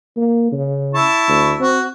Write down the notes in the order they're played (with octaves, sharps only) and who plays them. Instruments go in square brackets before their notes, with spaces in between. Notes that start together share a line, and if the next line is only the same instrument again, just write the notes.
[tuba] A#3
C#3
[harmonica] E4 A5 C#6
[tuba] D2
[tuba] C4 [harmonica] F#4